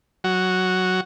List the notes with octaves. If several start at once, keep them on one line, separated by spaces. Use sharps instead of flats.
F#3 F#4